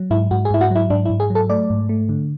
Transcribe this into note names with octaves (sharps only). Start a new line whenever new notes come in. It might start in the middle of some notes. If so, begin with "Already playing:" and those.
Already playing: F#3
G#2 E4
G#2 F#4
G#4
G#2 E4
F#4
F#3 E4
G#2 D4
E4
G#2
G#4
F#3
A4
A3 D5
G#2
A3
D3